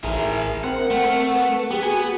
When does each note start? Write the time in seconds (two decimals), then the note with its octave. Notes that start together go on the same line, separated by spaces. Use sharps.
0.04 A1 G#4 A#4 E5
0.64 C4 A#4 F#5
0.90 A3 C4
1.33 B4
1.70 B3 G4 G#4
1.83 F#4 G#4 G#5